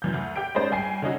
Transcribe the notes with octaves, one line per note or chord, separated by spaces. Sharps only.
F#2 E3 G6
D2
G4 G5 G6 D7
G#3 C#4 D#4 C5 D5
G1 G2 G5 G#5 C7
D3 C#4 D#4 F#4